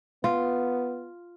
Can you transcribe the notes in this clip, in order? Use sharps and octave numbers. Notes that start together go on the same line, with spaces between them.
B3 F4